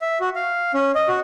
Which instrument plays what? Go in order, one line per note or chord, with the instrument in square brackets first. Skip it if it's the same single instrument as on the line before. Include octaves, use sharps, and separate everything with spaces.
[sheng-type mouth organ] E5
F#4
F5
C#4
D#5
F#4